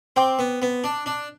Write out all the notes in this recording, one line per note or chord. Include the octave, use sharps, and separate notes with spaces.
C4 C5 G5 D6
B3
B3
D4
D4